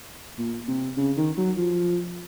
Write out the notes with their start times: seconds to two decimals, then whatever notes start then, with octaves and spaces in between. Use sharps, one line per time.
0.38 A#2
0.68 C3
0.97 C#3
1.17 D#3
1.37 F#3
1.57 F3